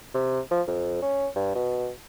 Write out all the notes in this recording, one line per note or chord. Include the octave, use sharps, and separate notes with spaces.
C3
F3
F2
C#4
G2
B2